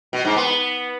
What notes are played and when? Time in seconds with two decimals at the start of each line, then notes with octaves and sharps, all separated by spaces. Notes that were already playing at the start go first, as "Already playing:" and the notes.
0.13 B2
0.25 G#2
0.36 B3